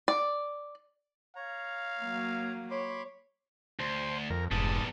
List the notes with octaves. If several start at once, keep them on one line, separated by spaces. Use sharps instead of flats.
D5
C#5 F5 A#5
F#3 A#3
C#5 B5 C6 D6
D2 C5
F2 A#4
F1 E2 G#2 G3 A5 D#6